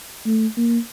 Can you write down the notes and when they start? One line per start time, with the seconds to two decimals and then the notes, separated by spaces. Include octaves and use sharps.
0.25 A3
0.57 A#3